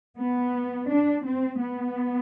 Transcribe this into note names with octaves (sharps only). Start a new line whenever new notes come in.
B3
D4
C4
B3